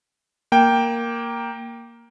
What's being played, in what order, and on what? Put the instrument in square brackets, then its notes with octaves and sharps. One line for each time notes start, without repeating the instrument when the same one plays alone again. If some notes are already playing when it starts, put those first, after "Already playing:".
[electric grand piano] A#3 G5